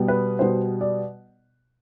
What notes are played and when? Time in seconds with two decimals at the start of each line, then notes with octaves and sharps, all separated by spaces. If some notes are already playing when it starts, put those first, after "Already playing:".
Already playing: B2 G3 B3
0.08 B4
0.39 B2 G3 B3 C5
0.81 D5